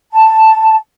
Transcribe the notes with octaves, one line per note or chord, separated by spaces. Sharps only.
A5